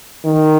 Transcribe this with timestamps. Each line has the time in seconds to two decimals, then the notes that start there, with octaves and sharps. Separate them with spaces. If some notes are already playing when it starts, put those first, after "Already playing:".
0.25 D#3